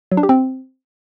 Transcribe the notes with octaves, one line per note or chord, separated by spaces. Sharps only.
F#3
D4
G4
C4